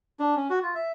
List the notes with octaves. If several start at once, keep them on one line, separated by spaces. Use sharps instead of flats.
D4
C#4
F#4
F4
E5